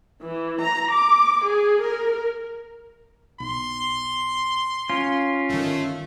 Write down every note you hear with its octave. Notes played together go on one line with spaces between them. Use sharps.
E3
A#5
D6
G#4
A#4
B1 C6
C#4 F4
G1 D#3 A3